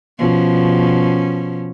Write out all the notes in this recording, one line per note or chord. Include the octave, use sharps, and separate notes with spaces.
B2 F3 C#4